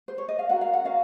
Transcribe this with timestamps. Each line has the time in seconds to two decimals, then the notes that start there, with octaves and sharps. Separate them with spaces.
0.08 C5
0.18 C#5
0.29 D#5
0.39 F5
0.49 C#4 F#4 A#4 F#5
0.61 F5
0.73 F#5
0.85 C#4 F#4 A#4 F5